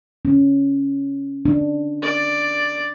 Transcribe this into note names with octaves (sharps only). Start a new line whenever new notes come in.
C#4
D4
D5